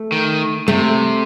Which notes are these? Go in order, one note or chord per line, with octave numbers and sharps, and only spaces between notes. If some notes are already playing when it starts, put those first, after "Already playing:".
Already playing: A3
D#3
C3 A3